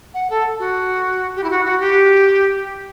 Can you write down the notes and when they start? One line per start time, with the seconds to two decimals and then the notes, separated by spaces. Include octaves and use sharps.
0.14 F#5
0.30 A4
0.59 F#4
1.35 G4
1.44 E4
1.50 F#4
1.65 F#4
1.80 G4